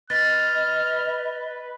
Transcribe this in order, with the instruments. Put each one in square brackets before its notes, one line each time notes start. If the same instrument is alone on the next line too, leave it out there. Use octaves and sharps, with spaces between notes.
[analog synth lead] B4 [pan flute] D#5 [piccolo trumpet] F6 [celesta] A6